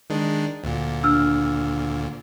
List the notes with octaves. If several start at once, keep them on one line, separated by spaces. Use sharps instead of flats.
D#3 G#3 D4
D2 A#2
D4 E6 F6